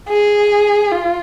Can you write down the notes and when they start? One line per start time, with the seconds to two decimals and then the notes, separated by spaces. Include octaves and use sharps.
0.09 G#4
0.91 F4